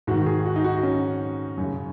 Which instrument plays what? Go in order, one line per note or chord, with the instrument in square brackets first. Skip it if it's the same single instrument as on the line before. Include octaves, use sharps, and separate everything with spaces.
[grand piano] G#2 D#3 F#4
G#4
F#4
D#4
F#4
C#4
F#2 C#3